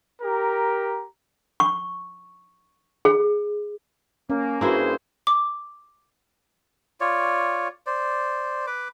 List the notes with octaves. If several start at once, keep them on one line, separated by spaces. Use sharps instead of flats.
G4 A#4 A#5
C#6
G#4
A#3 C#4
G2 A#3 E4 F#4 G#4 C5
D6
F4 C#5 D5
C5 D5
B4 D6